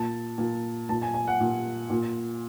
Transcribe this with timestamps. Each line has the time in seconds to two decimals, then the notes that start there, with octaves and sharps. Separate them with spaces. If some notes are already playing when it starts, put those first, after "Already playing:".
Already playing: A#2 A5
0.38 A#2
0.89 A#2 A5
1.02 G#5
1.14 G#5
1.28 F#5
1.40 A#2
1.90 A#2